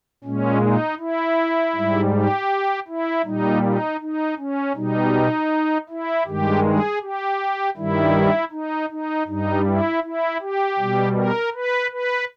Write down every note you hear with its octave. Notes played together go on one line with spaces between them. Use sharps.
A#2 G#3 C#4
D#4
E4
G#2 G3
G4
E4
A#2 G3 D#4
D#4
D#4
C#4
B2 G3 D#4
E4
G2 D#3 G#3 G4
G#4
G4
G2 D#3 G3 E4
D#4
D#4
G2 G3 D#4
E4
E4
G4
B2 G3
A#4
B4
B4